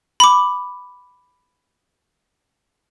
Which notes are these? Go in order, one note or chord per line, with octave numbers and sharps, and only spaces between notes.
B5 D6